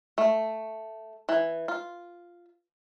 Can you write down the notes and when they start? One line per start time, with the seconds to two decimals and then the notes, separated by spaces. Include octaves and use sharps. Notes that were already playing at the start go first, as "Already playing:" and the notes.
0.18 A3
1.29 E3
1.68 F4